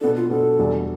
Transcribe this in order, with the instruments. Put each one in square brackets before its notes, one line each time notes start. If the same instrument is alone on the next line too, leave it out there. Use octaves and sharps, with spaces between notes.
[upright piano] B2 B3 D4 [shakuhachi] A4
[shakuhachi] F4
[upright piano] B2 B3 D4 [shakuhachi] A4
[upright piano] E2 B2 G3 D4